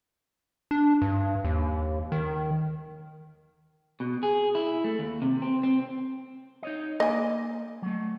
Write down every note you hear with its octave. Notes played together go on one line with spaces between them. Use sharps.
D4
G2
D#2
D#3
B2
G#4
E4
A3
D#2
C3
C4
C4
D#4 C#5 D#5
A#3 D#5 G#5
F#3 A3